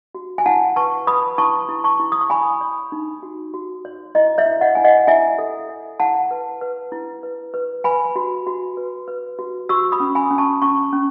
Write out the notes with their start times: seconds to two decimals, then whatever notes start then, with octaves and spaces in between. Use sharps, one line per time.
0.15 F#4
0.38 G#5
0.46 E4 F#5 A5
0.76 B4 A5 C#6
1.07 B4 B5 D#6
1.38 E4 A5 C#6
1.69 E4
1.84 A5 C#6
2.00 E4
2.12 D#6
2.21 C#6
2.30 C#5 G#5 B5
2.61 C#5
2.92 D#4
3.23 F#4
3.54 F#4
3.85 C#5
4.15 E4 D#5
4.38 C#5 E5
4.46 E4
4.61 D#5 F#5
4.75 E4 G#5
4.84 D#5 F#5
5.07 E4 E5 G#5
5.38 A4
5.69 C#5
6.00 E4 F#5 A5
6.31 B4
6.61 B4
6.92 E4
7.23 B4
7.54 B4
7.84 B4 G#5 B5
8.16 F#4
8.47 F#4
8.77 B4
9.08 B4
9.39 F#4
9.69 F#4 C#6 E6
9.92 B5 D#6
10.00 C#4
10.15 G#5 B5
10.31 C#4
10.38 A5 C#6
10.62 C#4 A5 C#6
10.93 C#4